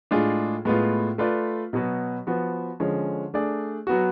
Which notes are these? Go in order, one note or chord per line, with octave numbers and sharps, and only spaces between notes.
A2 G#3 D4 F4 G#4
A2 G#3 B3 F4
A3 F4 B4 D5
B2 F#3 B3 F#4 B4
F3 B3 F#4
D3 F3 G#3 C#4
A3 D4 G#4 D5
F#3 B3 F#4